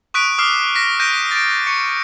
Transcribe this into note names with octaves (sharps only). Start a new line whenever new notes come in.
C#6 D#6 F#6 B6 D7
D6 D#6 F6 C7
A#6 B6
G6 A#6 D7 D#7
A6 D7
C#6 C#7